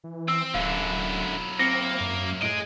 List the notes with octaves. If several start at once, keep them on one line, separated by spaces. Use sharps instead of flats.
E3
C4 E6
D1 F#2 D3 F#3 E4 F5
A#3 C4 A#6 C#7
F#2
A2 G#4 D#5 D7